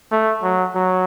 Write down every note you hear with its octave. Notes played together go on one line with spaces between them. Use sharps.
A3
F#3
F#3